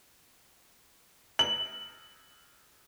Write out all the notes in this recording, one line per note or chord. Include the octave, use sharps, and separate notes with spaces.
F#7